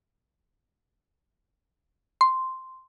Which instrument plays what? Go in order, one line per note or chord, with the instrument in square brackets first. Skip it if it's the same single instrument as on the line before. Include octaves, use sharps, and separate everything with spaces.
[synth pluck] C6